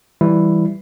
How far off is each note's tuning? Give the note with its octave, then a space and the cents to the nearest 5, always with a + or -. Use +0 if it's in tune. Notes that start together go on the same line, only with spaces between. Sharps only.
E3 +0 G3 +0 E4 +0